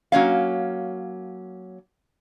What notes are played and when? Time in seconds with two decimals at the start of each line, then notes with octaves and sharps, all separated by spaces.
0.12 F#3 A#3 C#4 F5